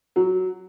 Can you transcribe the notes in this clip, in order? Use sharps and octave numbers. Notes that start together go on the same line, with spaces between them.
F#3